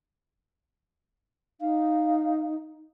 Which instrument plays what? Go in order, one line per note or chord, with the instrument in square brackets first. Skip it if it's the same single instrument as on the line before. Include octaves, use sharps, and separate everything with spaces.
[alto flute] D#4 [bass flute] F5